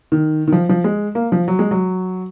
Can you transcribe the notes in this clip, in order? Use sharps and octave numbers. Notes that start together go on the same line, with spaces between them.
D#3
D#3
F3
F3
G#3
A#3
F3
F#3
G#3
F#3